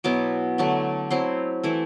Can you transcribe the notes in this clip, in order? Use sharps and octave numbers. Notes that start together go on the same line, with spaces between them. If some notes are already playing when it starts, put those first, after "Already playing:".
B2 F#3 B3 E4 D6
D3 F#3 A3
F#3 C4 E4 C6
E3 A3 E4